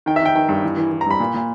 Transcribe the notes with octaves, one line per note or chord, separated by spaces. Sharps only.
D#3 G5
E5
D#3 G5
D#3 G5
G2
E3
E3
E3
A#5
G2 B5
A#2
A#2